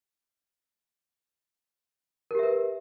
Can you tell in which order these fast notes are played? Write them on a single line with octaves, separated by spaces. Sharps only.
A#4 G4 E5 B4